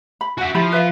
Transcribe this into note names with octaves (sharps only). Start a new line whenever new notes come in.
B5
F#4 E5 F#5 G#5
F3 E4 G4 B5
B4 E5 F5